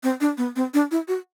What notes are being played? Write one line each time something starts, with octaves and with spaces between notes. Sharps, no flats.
C4
D4
B3
C4
D4
E4
F#4